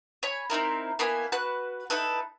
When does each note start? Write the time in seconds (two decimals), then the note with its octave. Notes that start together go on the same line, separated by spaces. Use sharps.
0.23 C#5 G#5 B5
0.50 C4 D#4 E4 A#4
0.99 A#3 B3 E4 G#5
1.32 F#4 B4 F#6
1.90 D#4 E4 A4 B4